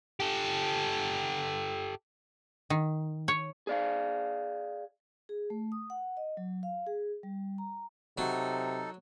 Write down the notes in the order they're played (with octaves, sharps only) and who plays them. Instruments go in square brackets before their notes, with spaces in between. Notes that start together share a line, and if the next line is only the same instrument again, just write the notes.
[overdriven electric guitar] G4 A4
[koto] D#3
C#5
[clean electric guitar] G#4 D5 F5
[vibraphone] G#4
A3
D#6
F#5
D#5
F#3
F5
G#4
G3
A#5
[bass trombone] C3 [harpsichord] F#3 [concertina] D#4 A4